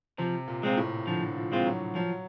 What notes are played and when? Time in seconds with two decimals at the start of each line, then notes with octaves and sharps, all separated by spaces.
0.18 C3 F3
0.48 A#2
0.63 G#3 C4 F4
0.77 A2
1.07 D3 F3
1.37 F3
1.52 G#3 C4 F4
1.66 F#3
1.95 F3 F#3